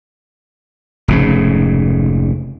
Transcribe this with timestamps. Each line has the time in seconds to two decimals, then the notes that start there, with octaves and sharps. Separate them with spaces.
1.08 F1 G#2 C#3